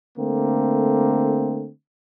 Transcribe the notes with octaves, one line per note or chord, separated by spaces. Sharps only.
D3 A3 A#3 C4